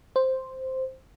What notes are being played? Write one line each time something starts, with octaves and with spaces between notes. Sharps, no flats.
C5